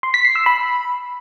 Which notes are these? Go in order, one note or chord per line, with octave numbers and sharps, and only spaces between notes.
C6
B6
C7
E6
B5